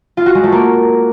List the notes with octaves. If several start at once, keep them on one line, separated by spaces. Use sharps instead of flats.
F4
F#4
G#3
A3
A#3